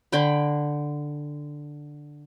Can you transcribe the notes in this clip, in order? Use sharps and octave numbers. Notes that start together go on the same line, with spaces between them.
D3 G5 B5